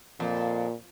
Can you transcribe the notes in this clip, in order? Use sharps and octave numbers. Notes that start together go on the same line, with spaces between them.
F2 A#2